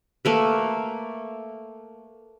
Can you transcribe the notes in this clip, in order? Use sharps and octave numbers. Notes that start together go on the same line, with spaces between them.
A3 A#3 B4